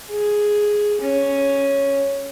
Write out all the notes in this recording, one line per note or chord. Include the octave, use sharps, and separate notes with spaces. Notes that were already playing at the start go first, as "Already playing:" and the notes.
G#4
C#4